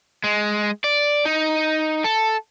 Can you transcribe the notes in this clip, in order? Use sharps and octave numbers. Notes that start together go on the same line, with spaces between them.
G#3
D5
D#4
A4